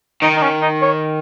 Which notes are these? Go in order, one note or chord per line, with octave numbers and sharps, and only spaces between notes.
D#3 D#4
D#4
C#4
D#4
C#5